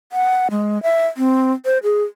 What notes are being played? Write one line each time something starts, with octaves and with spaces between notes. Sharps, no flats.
F#5
G#3
E5
C4
C5
G#4